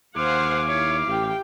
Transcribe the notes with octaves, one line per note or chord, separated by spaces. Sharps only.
D#2 C5 F5 F#5 G#5 D6
E4 C#5 F5
A1 G4 G5